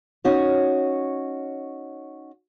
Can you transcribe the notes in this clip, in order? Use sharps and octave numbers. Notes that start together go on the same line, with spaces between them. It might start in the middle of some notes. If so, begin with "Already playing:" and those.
C#4 D#4 F#4 C#5